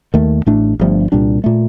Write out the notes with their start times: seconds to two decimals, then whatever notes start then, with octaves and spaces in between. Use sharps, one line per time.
0.14 D#2 D#3 A3
0.46 A1 A2 A3 D4
0.79 G1 G2 F3 A3
1.12 C2 A#2 G3 D4
1.44 A#2 A3